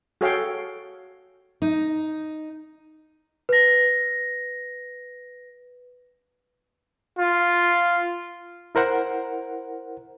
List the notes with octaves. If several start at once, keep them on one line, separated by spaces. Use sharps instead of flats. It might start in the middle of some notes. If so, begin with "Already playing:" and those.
F#4 G#4 A4 C#5 F5 G5
D#4
B4 A#6
F4
E4 A#4 C5 F#5